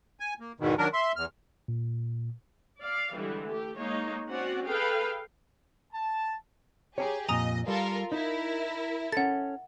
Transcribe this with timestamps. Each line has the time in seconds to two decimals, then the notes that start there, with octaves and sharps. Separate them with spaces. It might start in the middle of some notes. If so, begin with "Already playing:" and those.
0.20 G#5
0.40 A#3
0.60 E2 G#2 B2 D#3
0.78 D#3 F#3 D4 A#4
0.93 E5 C6
1.16 E2 F6
1.68 A#2
2.82 D5 F5
3.13 D3 E3 G3 G#3
3.46 A3 G4
3.77 G#3 A#3 D#4 C#5
4.27 C4 C#4 F#4 D5 F#5
4.66 G#4 A4 B4 F5 G5
5.93 A5
6.98 G4 G#4 C#5 G#5 A#5
7.29 F2 A#2 D#5 G#5 A#5 D#6
7.68 G3 F4 A4 A#4
8.12 D#4 E4 A#4
9.12 C#4 A4 F#5 A6